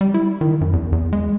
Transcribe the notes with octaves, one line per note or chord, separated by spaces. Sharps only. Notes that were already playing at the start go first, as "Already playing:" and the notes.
G3
E4
D#3
F#2
E2
E2
G#3